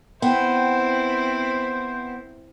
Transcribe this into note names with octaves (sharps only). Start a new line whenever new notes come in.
B3 C4 E4 C5 G5